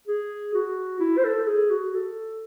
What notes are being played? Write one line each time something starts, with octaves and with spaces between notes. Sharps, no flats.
G#4
F#4
E4
C5
A4
G#4
F#4
A4